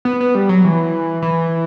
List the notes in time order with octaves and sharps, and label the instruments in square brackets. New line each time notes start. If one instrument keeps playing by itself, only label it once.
[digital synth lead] B3
B3
G3
F#3
E3
E3